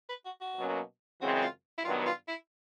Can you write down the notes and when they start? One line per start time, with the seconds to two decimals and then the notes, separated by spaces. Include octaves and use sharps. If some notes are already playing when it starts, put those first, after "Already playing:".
0.09 B4
0.25 F#4
0.41 F#4
0.57 B2 F#3 A#3 C#4
1.21 F#2 C#3 E3 G#3 C4 F#4
1.42 F4
1.78 E4
1.85 G2 D#3 F#3 B3 F4
2.06 F4
2.28 E4